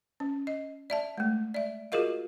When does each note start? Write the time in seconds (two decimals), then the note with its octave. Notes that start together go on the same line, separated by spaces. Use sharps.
0.20 C#4
0.47 D#5
0.90 D5 E5 A5
1.18 G#3 A3
1.54 D5 E5
1.92 F4 F#4 G#4 A#4 D#5 F5